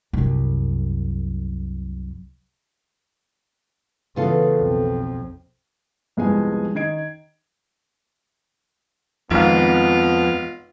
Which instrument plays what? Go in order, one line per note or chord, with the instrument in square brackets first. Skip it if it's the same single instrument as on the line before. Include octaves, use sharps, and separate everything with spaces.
[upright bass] C2 F#2
[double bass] C#3 E3 [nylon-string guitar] B3 F4 A4
[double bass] B1 F2
[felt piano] C2 F2 G#3 B3 G#5
D#3 D#5 G#6 D7
[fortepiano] G#1 G#2 F5 [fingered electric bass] F2 [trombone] B3 [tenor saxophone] F4